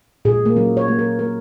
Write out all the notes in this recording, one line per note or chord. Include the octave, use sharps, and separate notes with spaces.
A#2 G#4
A#3
F#3 C#4
C#5
A#3
A#4
A#3 A#4